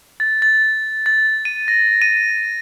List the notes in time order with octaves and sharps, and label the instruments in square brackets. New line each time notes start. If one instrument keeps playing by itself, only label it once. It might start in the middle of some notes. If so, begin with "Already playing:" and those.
[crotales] A6
A6
A6
D#7
A#6
D#7